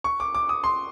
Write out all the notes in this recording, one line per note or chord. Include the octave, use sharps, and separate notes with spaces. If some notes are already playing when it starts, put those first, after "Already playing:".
C#6
D6
D6
D#6
C6